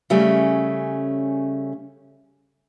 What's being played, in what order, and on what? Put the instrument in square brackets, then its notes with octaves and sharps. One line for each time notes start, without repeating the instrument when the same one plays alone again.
[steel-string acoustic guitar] C#3 G3 A3 C#4